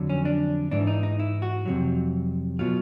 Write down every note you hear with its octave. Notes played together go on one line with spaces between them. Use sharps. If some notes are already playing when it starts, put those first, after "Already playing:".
Already playing: F2 D3 F#3
C#4
D4
G#2 E3 D4
D#4
D#4
E4
F#4
F2 C3 D#3 F#3
B2 F#3 F4